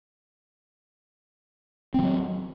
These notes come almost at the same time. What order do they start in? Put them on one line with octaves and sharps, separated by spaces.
C4 F3 F#3